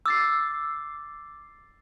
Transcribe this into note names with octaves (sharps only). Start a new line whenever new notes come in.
D6 E6 A6 C7